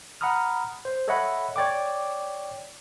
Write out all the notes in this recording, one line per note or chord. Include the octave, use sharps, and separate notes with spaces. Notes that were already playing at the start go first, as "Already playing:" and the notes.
F#5 A#5 B5 D#6 F6
C5
A4 C#5 D#5 E5 F#5 B5
C#5 D5 G5 D6